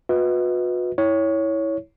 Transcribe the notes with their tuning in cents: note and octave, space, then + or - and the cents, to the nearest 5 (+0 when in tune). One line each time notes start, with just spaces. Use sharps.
F#4 -40 B4 +0 D#5 +35
E4 -20 C#5 +5